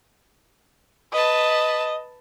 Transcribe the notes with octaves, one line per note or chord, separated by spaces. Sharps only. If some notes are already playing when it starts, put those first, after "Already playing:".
B4 D#5 A5